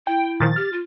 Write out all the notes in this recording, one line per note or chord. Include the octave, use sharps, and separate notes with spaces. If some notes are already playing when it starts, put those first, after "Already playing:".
E4 G5
A#2 D#3 F3 A6
G4 F6
F4